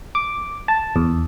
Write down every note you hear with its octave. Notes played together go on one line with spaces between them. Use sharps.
D6
A5
E2